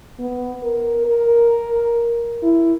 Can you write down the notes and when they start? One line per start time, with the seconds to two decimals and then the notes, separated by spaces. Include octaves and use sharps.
0.19 B3
0.63 A#4
1.06 A#4
2.43 E4